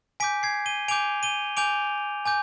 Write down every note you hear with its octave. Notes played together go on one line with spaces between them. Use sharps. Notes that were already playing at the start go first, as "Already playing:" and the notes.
G#5 D6 G6 B6 D7
G#6 C7
D#7 G7
G#5 D6 G6 D7 F7
D#7 G7
G#5 D6 G6 D7 F7
G#5 D6 G6